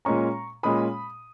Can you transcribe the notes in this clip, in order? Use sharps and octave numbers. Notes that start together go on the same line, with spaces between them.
A#2 G#3 C#4 A#5 C#6
A#2 G#3 C#4 B5 D#6